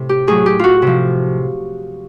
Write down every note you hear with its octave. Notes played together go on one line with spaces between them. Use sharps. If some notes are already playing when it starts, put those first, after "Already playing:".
Already playing: A2 C3
G4
A2 F#3 G#4
G4
F4 F#4
C3 F3